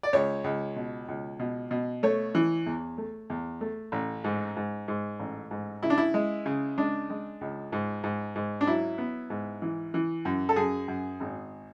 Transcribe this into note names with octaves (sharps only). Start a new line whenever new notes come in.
D5
C#2 C#5
C#2
B2
C#2
B2
B2
A3 C#5
E3
E2
A3
E2
A3
A1
G#2
G#2
G#2
A1
G#2
C#3 E4
D4
E4
G#3
C#3
G#3 D4
G#3
C#2
G#2
G#2
G#2
D4
F#3 E4
B3
G#2
E3
E3
F#2
A4
F#2 G#4
F#2
G#1